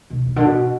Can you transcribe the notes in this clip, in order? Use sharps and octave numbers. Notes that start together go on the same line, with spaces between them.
B2
B2
D3
B2